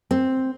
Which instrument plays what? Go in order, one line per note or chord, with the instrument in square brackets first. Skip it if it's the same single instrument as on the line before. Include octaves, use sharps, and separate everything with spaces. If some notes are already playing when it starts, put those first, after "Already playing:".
[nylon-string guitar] C4